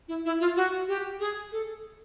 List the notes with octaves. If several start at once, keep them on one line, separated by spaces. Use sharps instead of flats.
E4
E4
F4
F#4
G4
G#4
A4